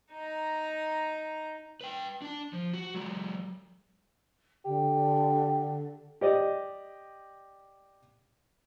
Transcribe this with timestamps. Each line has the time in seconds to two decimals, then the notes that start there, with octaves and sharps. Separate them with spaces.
0.13 D#4 A#5
1.81 B4 G5
2.22 D4 A5
2.53 F3
2.74 F#4
2.94 F#3 G#3
4.65 D3 G4
6.21 G4 D5 D#5